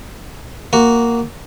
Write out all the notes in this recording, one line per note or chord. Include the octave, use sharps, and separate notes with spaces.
A#3 F#4